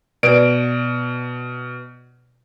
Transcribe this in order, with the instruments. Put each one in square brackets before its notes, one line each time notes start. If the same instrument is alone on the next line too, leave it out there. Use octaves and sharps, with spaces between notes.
[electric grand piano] B2 D7 [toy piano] B4 D5